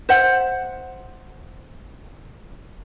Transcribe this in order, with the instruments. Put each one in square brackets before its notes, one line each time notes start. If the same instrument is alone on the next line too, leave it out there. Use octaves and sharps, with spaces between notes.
[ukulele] C5 E5 F#5